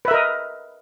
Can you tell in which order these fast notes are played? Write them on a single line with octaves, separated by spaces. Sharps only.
B4 E5 A#4 D#5